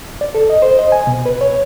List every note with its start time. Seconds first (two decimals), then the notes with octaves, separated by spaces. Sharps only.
0.21 D5
0.35 A4
0.50 D#5
0.62 C5
0.79 D#5
0.92 G#5
1.07 B2
1.26 B4
1.41 C#5